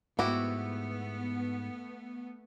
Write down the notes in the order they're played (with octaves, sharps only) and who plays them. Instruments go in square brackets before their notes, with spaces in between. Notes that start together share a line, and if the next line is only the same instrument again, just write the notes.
[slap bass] G#2 [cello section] A3 B3 [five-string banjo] E4 F#4 G4